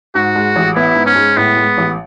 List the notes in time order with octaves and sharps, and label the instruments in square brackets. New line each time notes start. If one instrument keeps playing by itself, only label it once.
[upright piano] G#2 [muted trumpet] F#4
[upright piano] G#3
A1
[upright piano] B3 [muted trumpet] E4
[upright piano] G#2
[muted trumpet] C#4
[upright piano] G#3
[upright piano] A2 [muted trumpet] B3
[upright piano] G#3
A1